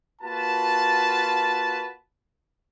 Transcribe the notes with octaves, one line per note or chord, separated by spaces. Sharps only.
A#3 F4 F#4 B4 A5